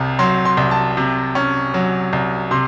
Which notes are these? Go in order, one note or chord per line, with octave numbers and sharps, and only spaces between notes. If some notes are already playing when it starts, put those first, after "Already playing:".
Already playing: C2 C3
F#3 C6
C6
C2
A5
C3
C#4
F#3
C2
C3 C6